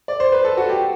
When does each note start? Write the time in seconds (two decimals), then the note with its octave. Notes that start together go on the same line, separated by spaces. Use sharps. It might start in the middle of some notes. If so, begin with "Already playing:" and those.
0.08 D5
0.20 C5
0.32 B4
0.45 A4
0.57 F#4
0.69 G4